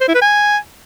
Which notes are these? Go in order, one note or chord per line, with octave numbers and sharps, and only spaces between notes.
C5
E4
B4
G#5